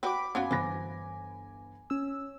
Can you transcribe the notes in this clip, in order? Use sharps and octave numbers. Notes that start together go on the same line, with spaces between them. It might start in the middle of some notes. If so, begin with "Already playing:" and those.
F#4 G4 B4 B5 D6
F#2 B3 F4 F#4 G#5
G1 E3 B4 C5 A#6
C#4 E6